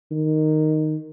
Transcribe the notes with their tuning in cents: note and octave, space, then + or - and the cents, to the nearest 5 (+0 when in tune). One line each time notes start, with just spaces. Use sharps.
D#3 -5